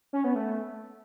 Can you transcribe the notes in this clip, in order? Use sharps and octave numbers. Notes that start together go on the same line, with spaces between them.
C#4
B3
A3